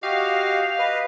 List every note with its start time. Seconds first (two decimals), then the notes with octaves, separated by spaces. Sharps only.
0.03 F#4 G4 D#5 F5
0.79 B4 D#5